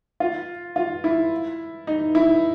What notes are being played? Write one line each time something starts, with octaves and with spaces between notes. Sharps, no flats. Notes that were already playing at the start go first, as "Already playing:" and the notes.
F4
F4
E4
D#4
E4